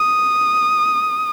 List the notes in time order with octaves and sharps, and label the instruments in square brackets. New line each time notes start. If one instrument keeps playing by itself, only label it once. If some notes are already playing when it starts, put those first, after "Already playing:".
Already playing: [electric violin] D#6